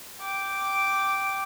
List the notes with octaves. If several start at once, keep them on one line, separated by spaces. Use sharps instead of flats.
G5 D6